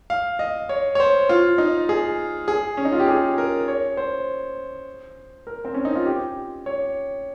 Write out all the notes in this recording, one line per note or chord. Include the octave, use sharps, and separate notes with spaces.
F5
D#5
C#5
C#5
C5
F4
D#4
G#4
G#4
C#4
D#4
F4
G4
G#4
A#4
C#5
C5
A#4
C4
C#4
D#4
F4
G4
C#5